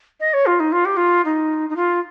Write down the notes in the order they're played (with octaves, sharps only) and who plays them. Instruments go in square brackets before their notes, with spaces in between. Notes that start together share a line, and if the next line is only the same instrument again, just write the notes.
[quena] D#5
C#5
F4
D#4
F4
G4
F4
D#4
D#4
F4